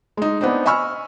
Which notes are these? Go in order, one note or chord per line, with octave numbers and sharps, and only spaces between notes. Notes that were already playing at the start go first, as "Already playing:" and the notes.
G#3 D#4
B3 C4 D4 D#4
D#5 G#5 B5 C#6 E6 F6